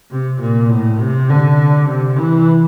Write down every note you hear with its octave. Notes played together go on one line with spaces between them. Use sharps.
C3
A#2
A2
C3
D3
C3
E3